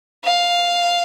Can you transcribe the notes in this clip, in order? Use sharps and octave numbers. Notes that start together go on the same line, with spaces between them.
F5